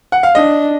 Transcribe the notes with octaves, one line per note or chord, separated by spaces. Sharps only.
F#5
F5
D4 D#5